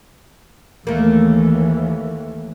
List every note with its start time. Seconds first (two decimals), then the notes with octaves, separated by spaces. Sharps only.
0.87 D#2 E3 A3 A#3